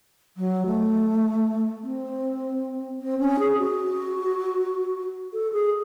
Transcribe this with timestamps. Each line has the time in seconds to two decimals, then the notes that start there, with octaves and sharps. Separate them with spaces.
0.37 F#3
0.66 A3
1.82 C4
3.00 C4
3.18 C#4
3.39 G#4
3.58 F#4
5.33 A4
5.52 G#4